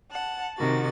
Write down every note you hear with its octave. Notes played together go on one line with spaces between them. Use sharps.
F#5 A5
C3 D#3 F#4 A6